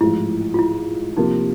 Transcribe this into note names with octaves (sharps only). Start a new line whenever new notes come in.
A1 G#2 F3 E4
F4
E4
C3 F3 A#3 D#4